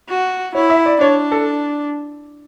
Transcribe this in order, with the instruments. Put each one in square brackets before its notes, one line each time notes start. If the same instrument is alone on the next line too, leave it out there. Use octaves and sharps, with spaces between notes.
[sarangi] F#4
[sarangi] E4 [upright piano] C#5
[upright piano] E5
D5
[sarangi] D4 [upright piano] C#5
[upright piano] A4